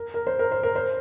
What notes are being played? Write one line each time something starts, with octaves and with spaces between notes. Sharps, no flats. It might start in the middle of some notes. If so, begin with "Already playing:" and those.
Already playing: A#4
A#4
C5
A#4
C5
A#4
C5